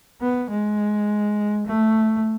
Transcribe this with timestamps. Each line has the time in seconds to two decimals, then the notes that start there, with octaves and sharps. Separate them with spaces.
0.21 B3
0.50 G#3
1.66 A3